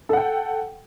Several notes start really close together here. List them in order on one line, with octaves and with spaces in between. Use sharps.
A4 F#5 G5